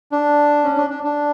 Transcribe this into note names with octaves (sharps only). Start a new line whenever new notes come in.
D4
C#4
D4
D4
D4